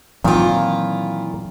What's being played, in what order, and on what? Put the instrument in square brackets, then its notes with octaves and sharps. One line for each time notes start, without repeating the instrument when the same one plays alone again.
[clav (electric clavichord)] A#2 D#3 [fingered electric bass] E3 F#3 C4 [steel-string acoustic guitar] E4 F4